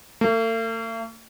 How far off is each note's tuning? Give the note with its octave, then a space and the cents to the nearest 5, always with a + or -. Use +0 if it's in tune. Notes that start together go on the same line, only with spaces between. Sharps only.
A3 +45